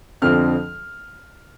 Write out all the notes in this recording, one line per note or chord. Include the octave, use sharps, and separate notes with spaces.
F2 D3 F3 C4 F6